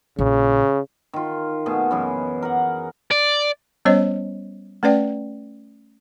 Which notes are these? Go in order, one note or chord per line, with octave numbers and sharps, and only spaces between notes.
A#1 C#3
D#3 F4
B2 A3 G#4
F#2 E3 G#4
A#4 F#5
D5
G3 B3 C#4 C5 C#5 D#5
A3 C#4 B4 D5 G5